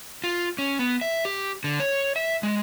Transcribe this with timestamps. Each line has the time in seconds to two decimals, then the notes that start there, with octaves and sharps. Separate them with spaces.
0.24 F4
0.59 C#4
0.79 B3
1.01 E5
1.25 G4
1.64 D3
1.80 C#5
2.16 E5
2.43 G#3